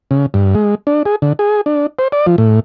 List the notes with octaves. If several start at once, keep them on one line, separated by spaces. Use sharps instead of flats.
C#3
G2
G#3
D4
G#4
D3
G#4
D4
C5
D5
F3
A2